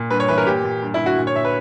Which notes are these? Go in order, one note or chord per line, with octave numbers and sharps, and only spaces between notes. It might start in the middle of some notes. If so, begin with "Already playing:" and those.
Already playing: A#2
G2 B4
C#5
E3 B4
A#4
A#2 G4
A#2
G2
E4
D3
F#4
A#2
C#5
A#2 E5
B4